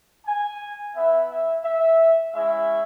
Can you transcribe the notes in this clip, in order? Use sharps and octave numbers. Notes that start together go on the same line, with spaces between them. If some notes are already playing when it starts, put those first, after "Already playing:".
G#5
B3 E4 E5
E5
E5
G#3 C#4 E4 E5